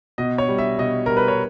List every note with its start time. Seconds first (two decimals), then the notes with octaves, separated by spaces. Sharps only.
0.18 B2 D#5
0.38 C#5
0.48 G3
0.58 E5
0.78 B2 D#5
1.06 G3 A#4
1.17 B4
1.28 C#5